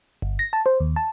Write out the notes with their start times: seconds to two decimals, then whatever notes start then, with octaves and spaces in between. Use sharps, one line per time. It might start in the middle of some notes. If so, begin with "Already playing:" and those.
0.22 G1
0.39 A#6
0.53 A5
0.66 C5
0.80 D#2
0.96 A5